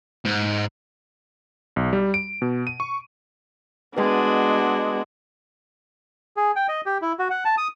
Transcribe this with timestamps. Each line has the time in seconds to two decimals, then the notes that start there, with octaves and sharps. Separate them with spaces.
0.25 G#2
1.76 B1
1.93 G3
2.14 D7
2.42 B2
2.67 D#7
2.80 C#6
3.97 G#3 B3 D4 F#4 B4 D#5
6.37 G#4
6.56 G5
6.68 D#5
6.86 G4
7.02 E4
7.19 F#4
7.30 F#5
7.45 A5
7.58 D#6